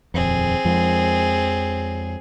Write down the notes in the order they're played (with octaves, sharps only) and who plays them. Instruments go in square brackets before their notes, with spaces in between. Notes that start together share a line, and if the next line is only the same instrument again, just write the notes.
[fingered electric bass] D#1 F2 [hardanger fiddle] C4 G#4
[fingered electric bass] F2 F3 G#3